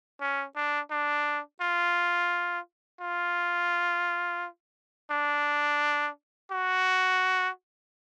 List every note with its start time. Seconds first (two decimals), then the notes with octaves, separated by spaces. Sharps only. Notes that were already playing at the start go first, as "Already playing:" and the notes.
0.21 C#4
0.56 D4
0.91 D4
1.62 F4
3.01 F4
5.11 D4
6.51 F#4